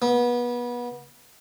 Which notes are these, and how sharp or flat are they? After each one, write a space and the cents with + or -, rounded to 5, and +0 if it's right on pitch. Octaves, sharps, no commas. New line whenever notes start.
B3 -30